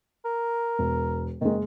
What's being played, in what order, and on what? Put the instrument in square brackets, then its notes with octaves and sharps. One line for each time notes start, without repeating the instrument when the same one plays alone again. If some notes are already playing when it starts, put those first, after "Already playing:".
[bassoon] A#4
[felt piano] E1
[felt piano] F#1 G#3 [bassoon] D#3